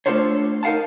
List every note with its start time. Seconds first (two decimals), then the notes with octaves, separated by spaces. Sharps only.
0.06 A3 D4 F4 A4 C5 C#5
0.63 D#4 A#4 F5 F#5 A5